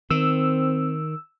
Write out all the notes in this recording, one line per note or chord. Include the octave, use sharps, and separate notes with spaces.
D#3 C4 E6